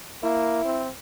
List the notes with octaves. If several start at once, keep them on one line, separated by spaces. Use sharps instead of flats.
A#3 E4
C4